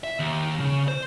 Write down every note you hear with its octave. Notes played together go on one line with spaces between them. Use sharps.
E5
D#2
C#3
C5